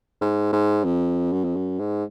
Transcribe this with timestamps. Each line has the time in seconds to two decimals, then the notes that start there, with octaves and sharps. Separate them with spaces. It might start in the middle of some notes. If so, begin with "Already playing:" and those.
0.21 G#2
0.53 G#2
0.84 F2
1.32 F#2
1.45 F2
1.56 F#2
1.79 G#2